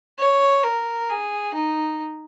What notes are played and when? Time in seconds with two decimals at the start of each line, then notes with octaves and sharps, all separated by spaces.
0.19 C#5
0.64 A#4
1.10 G#4
1.54 D#4